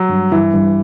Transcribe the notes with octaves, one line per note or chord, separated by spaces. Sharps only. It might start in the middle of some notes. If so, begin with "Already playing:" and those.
Already playing: F#3
G2
G2 E3
G2